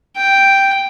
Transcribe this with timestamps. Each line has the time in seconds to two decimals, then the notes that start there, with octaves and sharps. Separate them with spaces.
0.16 G5